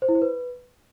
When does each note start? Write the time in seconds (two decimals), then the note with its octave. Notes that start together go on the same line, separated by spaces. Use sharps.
0.02 C5
0.09 E4
0.15 C5
0.22 B4